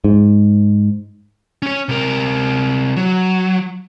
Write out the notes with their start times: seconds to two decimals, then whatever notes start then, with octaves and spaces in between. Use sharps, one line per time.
0.04 G#2
1.62 C#4 C#5
1.89 C3 A#4
2.96 F#3